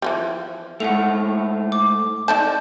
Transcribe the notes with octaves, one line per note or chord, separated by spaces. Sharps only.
E3 F3 G3
G#2 A3 F#5 F7
D6
D#4 D5 A5 G6